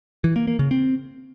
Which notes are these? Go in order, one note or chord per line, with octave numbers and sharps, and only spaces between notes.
E3
A#3
A#3
C#3
C4